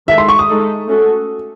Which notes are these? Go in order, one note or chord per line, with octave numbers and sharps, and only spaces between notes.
D#3 G#3 D#4 A4 E5
C6
C#6
D#6
G#3 D#4 A4
A3 C#4 F#4 A4